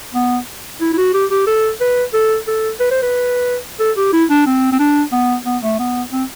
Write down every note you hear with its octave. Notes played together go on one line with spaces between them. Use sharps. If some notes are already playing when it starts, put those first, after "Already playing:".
B3
E4
E4
F#4
G4
G4
A4
B4
A4
A4
B4
C5
B4
A4
G4
E4
D4
C4
C4
D4
B3
B3
A3
B3
C4